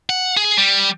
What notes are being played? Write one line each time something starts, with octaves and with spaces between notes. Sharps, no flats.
F#5
G#4
G3